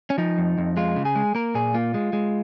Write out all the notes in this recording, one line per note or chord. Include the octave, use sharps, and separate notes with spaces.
C#4
F3 D#4
F2
F2
G#3 F4
C#3
G#4
G#3
A#3 A#4
A#2 G#4
A#3 F4
G#3
G#3